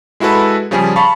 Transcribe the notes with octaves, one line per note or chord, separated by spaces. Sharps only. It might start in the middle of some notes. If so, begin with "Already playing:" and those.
G#3 E4 F#4 A4 B4
C#3 F3 G3 C#4 G#4
F5 A5 B5 C#6